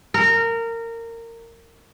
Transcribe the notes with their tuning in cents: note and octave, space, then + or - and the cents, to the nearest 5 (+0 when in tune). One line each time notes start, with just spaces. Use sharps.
A#4 -20